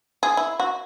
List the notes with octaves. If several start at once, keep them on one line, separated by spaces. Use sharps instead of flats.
G#4
E4
F#4